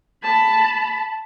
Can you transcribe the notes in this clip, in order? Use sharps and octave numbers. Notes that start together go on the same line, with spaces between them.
A5 B5